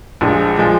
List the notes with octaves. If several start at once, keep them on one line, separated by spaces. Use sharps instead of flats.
A#1 A#2 F3 G#3
A#2 F3 G#3